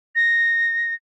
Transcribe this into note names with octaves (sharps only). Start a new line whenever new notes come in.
A#6